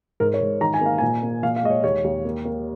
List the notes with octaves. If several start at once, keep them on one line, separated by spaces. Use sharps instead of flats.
G#2 A#4
C#5
G#2
D#3 A#5
G#5
A#3 F5
A#2 G#5
A#3
A#2 F5
F5
G#3 D#5
C#5
D#2 C#5
D#2
A#3
A#3